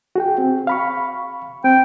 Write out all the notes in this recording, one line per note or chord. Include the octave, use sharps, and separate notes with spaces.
F#4 G#4 G5
C4
F5 B5 C#6
C4 G5